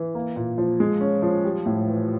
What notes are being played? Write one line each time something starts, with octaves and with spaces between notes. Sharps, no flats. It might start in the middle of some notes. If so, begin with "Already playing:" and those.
Already playing: E3
A#3
A#2
F3
G#3
C#4
F3
G3
A2
E3